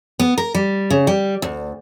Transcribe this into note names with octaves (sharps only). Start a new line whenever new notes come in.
B3
A#4
G3
C#3
G3
D2